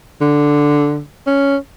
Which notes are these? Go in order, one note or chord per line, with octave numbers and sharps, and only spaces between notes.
D3
C#4